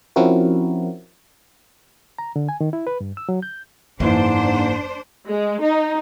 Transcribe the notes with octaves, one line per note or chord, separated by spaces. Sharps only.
F3 C4 C#4 E4 F#4 A#4
A#5
D3
G#5
D#3
E4
B4
G2
E6
F#3
G6
F#1 G#2 E3 A#3 D4 C5
G#3
D#4